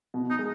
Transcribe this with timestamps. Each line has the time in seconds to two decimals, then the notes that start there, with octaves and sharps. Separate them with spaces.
0.14 B2
0.30 D#4
0.39 G#3